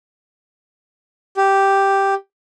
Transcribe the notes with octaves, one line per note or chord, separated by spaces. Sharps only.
G4